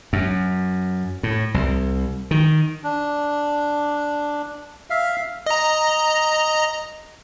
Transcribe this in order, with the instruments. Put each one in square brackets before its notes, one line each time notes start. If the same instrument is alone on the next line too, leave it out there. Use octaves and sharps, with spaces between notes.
[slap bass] F#2
A2
C2
D#3
[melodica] D4
E5 F5
[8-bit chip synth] D#5 A#5